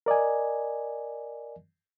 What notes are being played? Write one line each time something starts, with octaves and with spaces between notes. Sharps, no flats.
A#4 D5 D#5 G#5